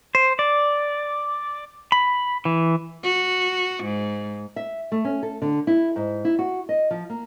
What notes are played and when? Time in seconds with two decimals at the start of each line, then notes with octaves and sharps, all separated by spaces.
0.15 C5
0.39 D5
1.92 B5
2.45 E3
3.03 F#4
3.84 G#2
4.56 E5
4.92 A3
5.05 C#4
5.23 A4
5.42 D3
5.67 E4
5.96 G#2
6.25 E4
6.39 F#4
6.69 D#5
6.91 F3
7.10 A#3